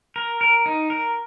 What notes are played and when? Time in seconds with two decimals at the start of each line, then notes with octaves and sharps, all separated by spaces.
0.16 A#4
0.41 A#4
0.66 D#4
0.90 A#4